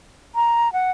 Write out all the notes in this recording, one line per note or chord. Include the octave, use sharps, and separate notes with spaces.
A#5
F#5